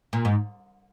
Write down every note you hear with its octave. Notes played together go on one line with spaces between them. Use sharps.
A#2
G#2